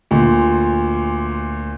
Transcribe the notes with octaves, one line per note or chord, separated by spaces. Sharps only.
D2 A#2